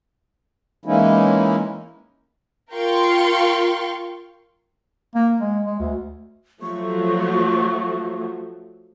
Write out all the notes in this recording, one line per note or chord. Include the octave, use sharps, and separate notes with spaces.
E3 G#3 A#3 C#4 D#4 E4
F4 A#4 F5 G5 C6 C#6
A#3
G#3
G#3
D2
F3 F#3 A3 C#6